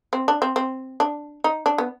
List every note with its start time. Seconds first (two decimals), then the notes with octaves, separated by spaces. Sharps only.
0.13 C4
0.28 D4
0.42 C4
0.56 C4
1.00 D4
1.44 D#4
1.66 D4
1.78 B3